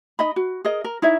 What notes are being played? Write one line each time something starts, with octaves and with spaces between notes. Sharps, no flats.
D#4 D#5 B5
F#4
G#4 A#4 D#5
A#4
D#4 E4 C#5 E5